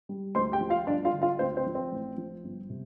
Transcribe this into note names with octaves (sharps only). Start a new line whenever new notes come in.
G3
D2 C5 C6
G4 G5
F3
F4 F5
G1 D4 D5
F4 F5
D3
F4 F5
D2 C4 C5
C4 C5
F3
C4 C5
A1
F3
G1
C3